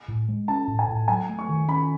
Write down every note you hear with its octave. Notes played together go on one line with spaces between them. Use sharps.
A2
G#3
C#4 A5
A2
G#5
A2
F#3 G#5
A3
C#6
D#3
C#4 B5